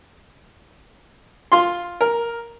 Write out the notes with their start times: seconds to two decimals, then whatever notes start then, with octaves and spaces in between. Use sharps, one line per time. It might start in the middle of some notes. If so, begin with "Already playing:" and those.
1.52 F4 C6
2.01 A#4